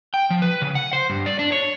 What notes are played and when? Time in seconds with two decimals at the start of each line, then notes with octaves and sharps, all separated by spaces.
0.14 G5
0.30 F3
0.42 B4
0.62 C#3
0.75 F#5
0.93 C5
1.10 G2
1.26 D5
1.39 D4
1.52 C#5